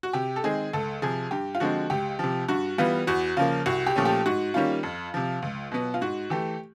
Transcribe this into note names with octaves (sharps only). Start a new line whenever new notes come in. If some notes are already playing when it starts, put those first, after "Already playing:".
F#4
C3 G4
A4
D#3 G#3 C4 G#4
C#2 A4
C3 F3 G#4
G2 G4
F4
D3 F3 G#3 C4 F#4
C#2 G4
C3 F3
G2 F#4
E3 G3 B3 F4
E2 F#4
C#3 F3 A#3 F4
C2 F#4
G4
A#2 F3 A3 C#4
G4
G#2 F#4
D#3 G3 A#3 C#4 F4
F2
C3 F3
C#2
B2 F#3 B3
F4
G#2 F#4
E3 A3 G4